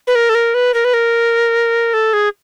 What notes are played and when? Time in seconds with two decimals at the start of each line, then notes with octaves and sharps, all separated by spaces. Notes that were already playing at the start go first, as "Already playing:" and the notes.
0.07 B4
0.15 A#4
0.29 A4
0.35 A#4
0.54 B4
0.74 A#4
0.85 B4
0.94 A#4
1.94 A4
2.13 G#4